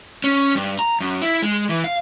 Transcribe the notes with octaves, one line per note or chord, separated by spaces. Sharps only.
C#4
G2
A#5
F#2
E4
G#3
E3
F5